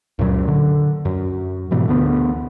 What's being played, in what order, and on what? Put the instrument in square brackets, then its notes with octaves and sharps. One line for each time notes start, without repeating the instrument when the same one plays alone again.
[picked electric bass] C#2 F#2 A#2 F#3
D3
F#2
G#2 B2 E3
D2 D3 B3